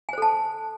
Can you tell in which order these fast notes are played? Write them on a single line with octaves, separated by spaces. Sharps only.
G#5 C5 A4 A5